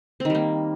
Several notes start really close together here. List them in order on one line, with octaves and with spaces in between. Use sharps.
C4 D#3 G3 A#3